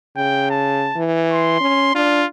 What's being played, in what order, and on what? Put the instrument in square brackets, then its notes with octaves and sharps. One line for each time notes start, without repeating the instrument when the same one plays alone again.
[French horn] C#3 [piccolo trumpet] G5
[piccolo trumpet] A5
[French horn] E3
[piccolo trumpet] C6
[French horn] C#4
[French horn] D4 [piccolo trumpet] F4